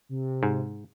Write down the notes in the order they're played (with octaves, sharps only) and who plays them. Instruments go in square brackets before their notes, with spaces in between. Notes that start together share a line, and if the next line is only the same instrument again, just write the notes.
[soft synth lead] C3
[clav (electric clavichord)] G#2